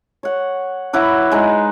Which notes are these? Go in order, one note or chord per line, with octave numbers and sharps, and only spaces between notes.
C#5 F#5
F#3 E4 B4 D6
G#3 D#4